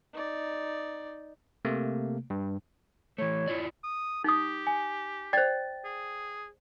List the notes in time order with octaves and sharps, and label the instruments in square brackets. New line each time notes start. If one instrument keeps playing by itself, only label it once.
[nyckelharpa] D#4 D5
[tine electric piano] C3 A3 A#3
G2
[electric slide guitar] E3 A3 [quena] C#5
[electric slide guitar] E4 F4 D5
[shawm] D#6
[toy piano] D#4 D#6 [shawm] G4
[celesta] G#5
[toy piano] C5 D5 [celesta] G5 A6
[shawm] G#4